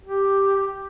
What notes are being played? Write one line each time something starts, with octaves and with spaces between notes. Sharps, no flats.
G4